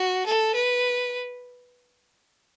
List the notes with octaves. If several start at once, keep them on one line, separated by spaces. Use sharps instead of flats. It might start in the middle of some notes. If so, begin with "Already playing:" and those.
Already playing: F#4
A4
B4